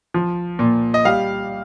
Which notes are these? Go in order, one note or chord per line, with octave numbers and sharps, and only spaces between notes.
F3
A#2
D#5
G3 F5